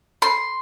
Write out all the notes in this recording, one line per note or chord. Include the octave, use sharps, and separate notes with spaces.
C6